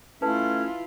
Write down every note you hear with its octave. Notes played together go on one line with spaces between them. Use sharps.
A3 C#4 E4 F4 B4 A5